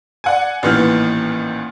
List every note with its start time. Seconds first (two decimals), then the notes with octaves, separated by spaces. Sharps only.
0.24 D5 F#5 G#5
0.63 A1 A#2 D#3 E3 B3 F6